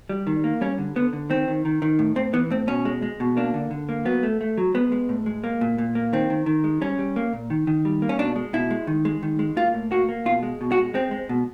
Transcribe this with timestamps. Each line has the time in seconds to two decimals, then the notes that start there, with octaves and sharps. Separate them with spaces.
0.09 G3
0.27 D#3
0.44 A#3
0.61 G3 C#4
0.78 D3
0.96 D3 B3
1.13 D3
1.30 D#3 C4
1.48 D#3
1.65 D#3
1.82 D#3
1.99 A2
2.16 A2 C4
2.33 E3 B3
2.50 A2 C4
2.67 B2 C#4
2.85 G#3
3.02 G#3
3.20 B2
3.37 A#3 D4
3.54 D3
3.71 D3
3.89 A#3
4.05 F#3 B3
4.23 A3
4.41 A3
4.58 F#3
4.74 G#3 B3
4.92 G#3
5.09 A2
5.26 G#3
5.44 A#3
5.61 A#2
5.78 A#2
5.95 A#3
6.13 D#3 C4
6.30 D#3
6.46 D#3
6.64 G#3
6.81 G3 C#4
6.99 G3
7.16 A#3
7.33 A#2
7.50 D#3
7.67 D#3
7.85 G3
8.02 A#3
8.09 C#4
8.19 B2 D4
8.36 G#3
8.53 B2 E4
8.71 G#3
8.87 D#3
9.05 G#3
9.23 D#3
9.39 G#3
9.57 A#3 F4
9.74 A2
9.91 A#3 F#4
10.09 A#3
10.26 B2 F4
10.43 G#3
10.61 B2
10.72 F#4
10.77 G#3
10.94 G#3 C4
11.11 G#3
11.29 B2